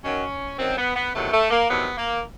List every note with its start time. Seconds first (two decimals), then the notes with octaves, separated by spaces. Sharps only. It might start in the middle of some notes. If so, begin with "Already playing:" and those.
0.04 F#2 D#3 F#3 C#4
0.59 F#2 D#3 F#3 C4
0.78 B3
0.96 B3
1.14 E2 C3 D#3 F#3 A3
1.33 A3
1.50 A#3
1.69 E2 C3 D#3 F#3 B3
1.97 A#3